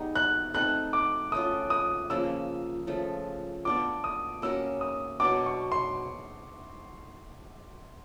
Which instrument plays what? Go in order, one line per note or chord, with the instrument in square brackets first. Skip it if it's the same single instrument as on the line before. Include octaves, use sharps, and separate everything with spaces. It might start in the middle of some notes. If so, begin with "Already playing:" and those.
Already playing: [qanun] G3 B3 D#4 G#4
[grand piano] F#6
[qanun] A3 C4 D#4 [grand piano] F#6
[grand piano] D6
[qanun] A3 C#4 F4 [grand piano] D#6
[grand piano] D#6
[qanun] C#3 F3 A#3 C#4 [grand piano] E6
[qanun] C#3 F3 A3
[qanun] B3 D4 F4 [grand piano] D6
[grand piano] D#6
[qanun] A#3 C#4 F#4 A#4 [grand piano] E6
[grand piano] D#6
[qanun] B2 F#3 B3 D4 [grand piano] D6
[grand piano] C#6
C6